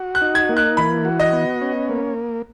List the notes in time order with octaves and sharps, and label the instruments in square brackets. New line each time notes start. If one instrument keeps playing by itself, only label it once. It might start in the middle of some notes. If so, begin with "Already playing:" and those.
Already playing: [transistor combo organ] F#4
[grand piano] F#6
[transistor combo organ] D#4
[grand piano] G#6
[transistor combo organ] A#3
[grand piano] F#6
[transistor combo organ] E3 [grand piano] B5
[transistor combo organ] F#4
[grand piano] D#5
[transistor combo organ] B3
C#4
A#3